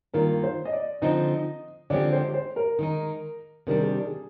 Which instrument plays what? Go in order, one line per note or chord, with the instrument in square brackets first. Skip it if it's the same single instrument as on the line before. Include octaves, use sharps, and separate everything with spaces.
[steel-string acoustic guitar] G2 D#3 A#3 F4 [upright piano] A#4
[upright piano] C5
D#5
D5
[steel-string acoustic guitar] D3 F3 C4 D#4 [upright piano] D#5
[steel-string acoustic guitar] D3 F3 G#3 C4 G4 [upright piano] D5
[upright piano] C5
C5
A#4
[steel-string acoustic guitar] D#3 G#3 D#4
[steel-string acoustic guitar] C3 D#3 G3 D4 [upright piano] A#4
[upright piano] G#4
G4
G#4